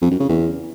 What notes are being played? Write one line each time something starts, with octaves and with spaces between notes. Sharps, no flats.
F2
F#2
C#3
E2